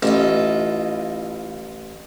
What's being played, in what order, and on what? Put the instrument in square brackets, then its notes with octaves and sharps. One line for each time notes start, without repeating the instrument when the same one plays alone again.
[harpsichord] A1 [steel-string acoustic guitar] E4 F4 D#5